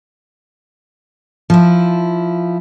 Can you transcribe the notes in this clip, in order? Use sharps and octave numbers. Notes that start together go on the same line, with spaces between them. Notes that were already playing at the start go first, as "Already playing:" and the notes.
F3 E4